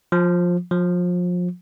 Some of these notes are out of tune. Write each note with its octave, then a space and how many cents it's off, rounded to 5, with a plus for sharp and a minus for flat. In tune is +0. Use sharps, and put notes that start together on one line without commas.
F3 +15
F3 +30